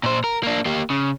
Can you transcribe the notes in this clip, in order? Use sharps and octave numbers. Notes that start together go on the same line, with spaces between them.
A#2 C5
A#4
A#3 D4
A#3 G4
C#3